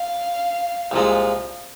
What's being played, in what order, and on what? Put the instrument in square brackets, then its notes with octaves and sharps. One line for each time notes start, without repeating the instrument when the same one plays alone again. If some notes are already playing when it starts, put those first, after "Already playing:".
Already playing: [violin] F5
[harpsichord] C2 A#2 F3 G#3